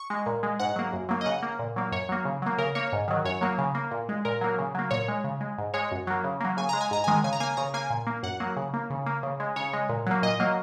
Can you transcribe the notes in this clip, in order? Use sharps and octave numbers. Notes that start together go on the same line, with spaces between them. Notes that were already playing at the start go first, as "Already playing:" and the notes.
Already playing: C#6
G#3
A#2
G#3
G#2 F#5
F#3 A#3
F#2
F#3 A#3
D#5
C#3 F#5
A#3
A#2
F#3 A#3
F#2 C#5
F#3 A#3
C#3
F#3 A#3
C#3 A#4
A#3 C#5
G#2
D#3 F#3
F#2 C#5
F#3 A#3
C#3
A#3
A#2
G#3
A#2 A#4
F#3 A#3
C#3
F#3 A#3
A#2 C#5
G#3
C#3
G#3
G#2
G#3 C#5
F#2
F#3 A#3
C#3
F#3 A#3
C#3 G#5
G#3 A#5
G#5
G#2 A#5
G#5
D#3 G#3
C#3 G#5
A#5
A#3 G#5
C#3 A#5
A#3 G#5
A#2
A#3
F#2 F#5
F#3 A#3
C#3
A#3
C#3
A#3
C#3
G#3
C#3 C#5
G#3
A#2
F#3 A#3
A#2 D#5
F#3 A#3